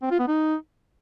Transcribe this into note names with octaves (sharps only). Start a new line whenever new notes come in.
C4
F4
B3
D#4